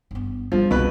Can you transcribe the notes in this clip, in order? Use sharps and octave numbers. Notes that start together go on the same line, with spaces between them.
G1 B3
F3 G3 A3
C2 B2 B4